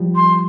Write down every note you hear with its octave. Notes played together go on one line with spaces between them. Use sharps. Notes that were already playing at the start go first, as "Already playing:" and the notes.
Already playing: F3 G3
C6